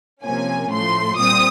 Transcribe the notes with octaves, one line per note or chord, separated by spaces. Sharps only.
C3 F3 A#3 C#4 G#5
A2 F3 A3 C6
A#2 G3 C4 D#6